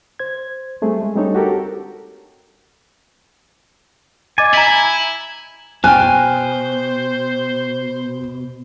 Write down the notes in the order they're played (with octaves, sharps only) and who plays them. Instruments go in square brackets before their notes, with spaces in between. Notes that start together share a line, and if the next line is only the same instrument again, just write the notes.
[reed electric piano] C5 G#6
G3 A3 C4 G#4
G#3
G3 C4 D4 D#4 A4 C#5
F#4 G4 A4 A#4
[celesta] D#5 D6 A6 [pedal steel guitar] G#5
[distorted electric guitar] E4 [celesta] A#5 B6
[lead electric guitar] B2 [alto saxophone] C5 [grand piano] G5 F6 F#6 [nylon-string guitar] G#5